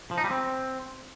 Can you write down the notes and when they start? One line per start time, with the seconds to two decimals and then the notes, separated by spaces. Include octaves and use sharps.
0.11 F3
0.18 D#4
0.24 G3
0.31 C4